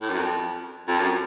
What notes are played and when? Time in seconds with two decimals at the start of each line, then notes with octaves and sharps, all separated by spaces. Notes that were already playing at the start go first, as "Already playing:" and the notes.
0.02 A2
0.10 F#2
0.17 F2
0.88 F2
1.00 F#2